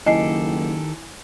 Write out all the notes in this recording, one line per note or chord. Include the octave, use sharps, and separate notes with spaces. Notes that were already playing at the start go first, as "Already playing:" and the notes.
F#1 D#3 E4 G4 A4 D#5 G#5 C7